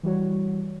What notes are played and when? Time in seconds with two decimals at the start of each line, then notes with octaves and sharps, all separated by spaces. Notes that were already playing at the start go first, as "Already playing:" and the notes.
0.03 E3 G3 F#4 C#5